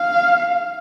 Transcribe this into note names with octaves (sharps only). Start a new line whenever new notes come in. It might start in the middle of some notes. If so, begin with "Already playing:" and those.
Already playing: F5